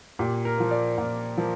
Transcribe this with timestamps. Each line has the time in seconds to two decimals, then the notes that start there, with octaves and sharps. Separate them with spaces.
0.19 A#2 G4
0.45 A#4
0.58 F3 A#3
0.71 D5
0.98 A#2
1.38 F3 A#3